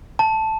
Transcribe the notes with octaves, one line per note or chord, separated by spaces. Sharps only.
A5